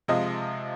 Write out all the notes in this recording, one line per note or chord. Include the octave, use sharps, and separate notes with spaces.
C3 F3 G#3 D#5